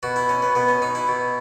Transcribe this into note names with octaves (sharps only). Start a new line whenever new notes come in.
B2 F#4
E4
C#4
B3
B2 B3
C#4
D#4
E4
B2